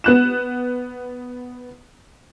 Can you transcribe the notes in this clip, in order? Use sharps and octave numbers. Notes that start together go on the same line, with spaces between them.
B3 F#6 E7